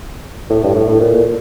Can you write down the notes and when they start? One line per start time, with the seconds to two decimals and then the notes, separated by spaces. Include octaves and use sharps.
0.50 A2
0.63 G2
0.75 A2
0.88 A2
1.01 A#2
1.13 A#2